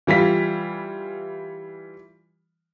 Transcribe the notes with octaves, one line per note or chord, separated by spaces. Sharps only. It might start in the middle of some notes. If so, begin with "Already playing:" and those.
E3 G3 F4 B6